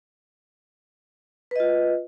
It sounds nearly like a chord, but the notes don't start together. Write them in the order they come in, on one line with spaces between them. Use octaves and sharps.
B4 D#5 F4